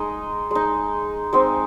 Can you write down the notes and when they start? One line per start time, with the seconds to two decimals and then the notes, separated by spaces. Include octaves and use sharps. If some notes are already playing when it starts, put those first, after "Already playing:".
Already playing: G#3 D#4 D#5
0.51 G#3 D#4
1.33 G#3 C4 D#4